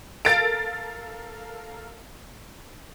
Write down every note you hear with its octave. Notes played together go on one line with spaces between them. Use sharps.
A4 A#4 F5 A6 D7